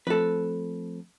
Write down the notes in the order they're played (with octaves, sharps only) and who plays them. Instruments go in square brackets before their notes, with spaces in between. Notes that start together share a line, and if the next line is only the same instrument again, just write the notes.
[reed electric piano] F3 A3 C4 [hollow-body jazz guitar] A4 B4